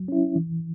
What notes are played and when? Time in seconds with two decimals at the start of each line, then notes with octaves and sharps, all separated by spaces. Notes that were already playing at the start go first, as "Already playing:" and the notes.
Already playing: F#3
0.08 C#4 E4
0.35 E3